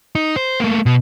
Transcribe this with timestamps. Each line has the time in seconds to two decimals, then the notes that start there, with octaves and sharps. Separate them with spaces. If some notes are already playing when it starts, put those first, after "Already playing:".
0.15 D#4
0.36 C5
0.60 A3 A#3
0.86 B2